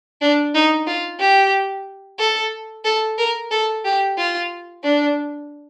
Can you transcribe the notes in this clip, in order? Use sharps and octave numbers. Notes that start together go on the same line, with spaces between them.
D4
D#4
F4
G4
A4
A4
A#4
A4
G4
F4
D4